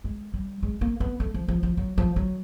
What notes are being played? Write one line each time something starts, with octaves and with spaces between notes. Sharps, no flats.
G#3
G3
G#3
A#3
B3
A3
F3
F3
F3
F#3
F3
F#3